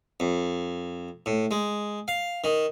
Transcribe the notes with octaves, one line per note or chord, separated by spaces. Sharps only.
F2
A2
G#3
F5
D#3